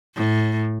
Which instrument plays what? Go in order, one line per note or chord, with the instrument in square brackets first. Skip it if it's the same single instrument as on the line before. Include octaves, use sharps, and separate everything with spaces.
[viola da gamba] A2